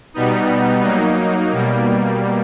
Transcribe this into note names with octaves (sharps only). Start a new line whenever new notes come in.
B2 G3 B3 D#4
F#3 A#3 D#4
B2 G3 A#3